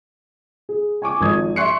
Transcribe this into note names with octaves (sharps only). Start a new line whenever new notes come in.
G#4
G#5 C#6 D6
G#1 F3 D#6 G#6
E5 C6 C#6 F#6 C7 C#7